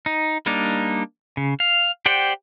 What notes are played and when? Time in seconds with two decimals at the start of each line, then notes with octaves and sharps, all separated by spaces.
0.06 D#4
0.46 G3 A#3 D4 D#4
1.37 C#3
1.60 F5
2.06 G4 C5 D5 F#5 G5